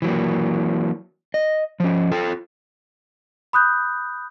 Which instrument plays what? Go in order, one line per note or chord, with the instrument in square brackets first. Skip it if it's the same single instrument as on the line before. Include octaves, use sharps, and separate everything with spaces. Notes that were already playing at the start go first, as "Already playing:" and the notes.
[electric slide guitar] E3 F#3 A#3
D#5
F3 C#4
F4 A4
[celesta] B5 D#6 F#6 G6